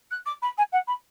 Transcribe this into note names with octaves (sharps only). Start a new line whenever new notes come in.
F#6
D6
B5
G#5
F#5
B5